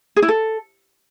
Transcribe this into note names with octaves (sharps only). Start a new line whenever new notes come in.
G#4
E4
A4